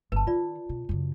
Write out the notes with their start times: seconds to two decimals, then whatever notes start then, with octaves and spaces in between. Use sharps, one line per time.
0.12 G1 B4 A5
0.27 D#3 F4 D5
0.69 B2
0.89 F#2 C#3